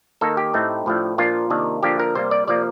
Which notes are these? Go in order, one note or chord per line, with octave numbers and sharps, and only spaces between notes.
D#3 A#3 D#4 A4
G4
A2 A3 C4 D#4
A2 F3 A3 D4
A#2 F3 A#3 D4 F4
C3 D#3 A#3 D4
D3 F3 A#3 D4 G4
A#4
C3 G3 A#3 C5
D5
C3 F3 A#3 D5